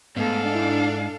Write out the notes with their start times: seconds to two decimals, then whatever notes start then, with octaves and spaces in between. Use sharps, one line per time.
0.17 G#2 A3 B3 D4 A4 F5
0.55 E4